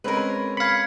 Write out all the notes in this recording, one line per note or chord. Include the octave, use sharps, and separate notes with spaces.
G#3 C4 C#4 A#4 B4
F5 B5 G#6 C#7